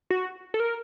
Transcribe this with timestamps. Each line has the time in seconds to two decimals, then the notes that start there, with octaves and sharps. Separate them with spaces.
0.10 F#4
0.54 A4
0.60 A#4